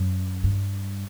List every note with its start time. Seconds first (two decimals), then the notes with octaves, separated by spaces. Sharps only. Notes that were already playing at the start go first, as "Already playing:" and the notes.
Already playing: F#2
0.44 G2